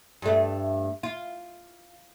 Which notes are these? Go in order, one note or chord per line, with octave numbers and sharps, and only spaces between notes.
G2 A3
F4